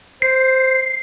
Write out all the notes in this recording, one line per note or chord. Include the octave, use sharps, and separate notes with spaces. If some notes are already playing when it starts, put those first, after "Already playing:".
C5 C7